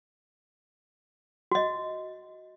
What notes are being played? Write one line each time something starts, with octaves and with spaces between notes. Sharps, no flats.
F#4 D#5